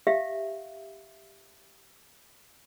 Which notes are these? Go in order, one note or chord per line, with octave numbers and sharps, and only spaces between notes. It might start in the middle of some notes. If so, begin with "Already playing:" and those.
G4 E5 F5